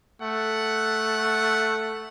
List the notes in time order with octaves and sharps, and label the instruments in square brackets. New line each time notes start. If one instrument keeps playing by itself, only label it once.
[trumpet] A3 [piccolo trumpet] F#5